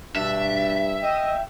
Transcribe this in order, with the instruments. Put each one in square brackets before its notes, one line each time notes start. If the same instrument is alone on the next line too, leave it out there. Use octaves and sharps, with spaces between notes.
[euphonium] G2 [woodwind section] B2 D4 [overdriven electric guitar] E5
[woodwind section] D#5 [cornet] G5